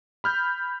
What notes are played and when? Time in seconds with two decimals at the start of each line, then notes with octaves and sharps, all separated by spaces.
0.24 B5 F6 G6